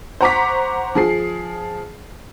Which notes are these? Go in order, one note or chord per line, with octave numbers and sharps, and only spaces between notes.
C5 F#5 A#5 C#6 D6 B6
F3 G#4 C7